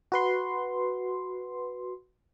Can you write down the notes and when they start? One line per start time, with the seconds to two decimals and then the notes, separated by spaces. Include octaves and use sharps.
0.12 F#4 B4 C6